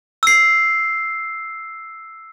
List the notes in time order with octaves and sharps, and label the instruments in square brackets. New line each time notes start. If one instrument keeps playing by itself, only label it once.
[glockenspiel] E6 C7